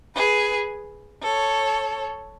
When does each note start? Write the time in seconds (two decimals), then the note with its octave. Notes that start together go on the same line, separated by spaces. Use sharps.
0.15 G#4 B4
1.24 A4 C#5